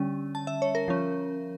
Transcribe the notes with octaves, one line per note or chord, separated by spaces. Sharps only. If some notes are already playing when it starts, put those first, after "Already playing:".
Already playing: D3 G3 C#4
A5
E5
C#5
A#4
F3 C#4